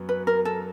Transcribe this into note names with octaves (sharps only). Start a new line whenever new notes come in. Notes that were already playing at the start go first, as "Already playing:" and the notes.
Already playing: F#2 F#3 B3
B4
A#4
A4